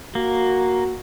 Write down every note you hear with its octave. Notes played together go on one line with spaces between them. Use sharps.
A#3 F#4